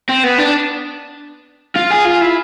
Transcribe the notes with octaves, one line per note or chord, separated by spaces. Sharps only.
C4
B3
D4
F4
G#4
F4
E4